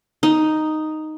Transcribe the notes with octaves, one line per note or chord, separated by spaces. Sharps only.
D#4